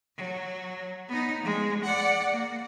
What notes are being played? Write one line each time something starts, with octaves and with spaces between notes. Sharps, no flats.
F#3
B3 D#4
F3 G#3
D5 F#5
A#3